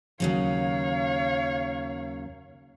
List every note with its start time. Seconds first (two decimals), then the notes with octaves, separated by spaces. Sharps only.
0.20 D#2 C#3 F#3 C#5 F5